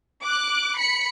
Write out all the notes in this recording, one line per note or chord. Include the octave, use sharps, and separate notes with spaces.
D6 F#6
B5 C#7